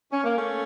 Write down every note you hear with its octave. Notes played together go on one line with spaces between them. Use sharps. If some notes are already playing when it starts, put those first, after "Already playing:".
C#4
A#3
A3 C#4